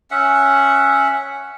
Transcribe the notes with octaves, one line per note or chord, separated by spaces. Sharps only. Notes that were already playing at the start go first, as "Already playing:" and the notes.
C#4 E5 F#5